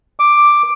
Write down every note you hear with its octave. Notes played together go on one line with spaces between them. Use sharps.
D6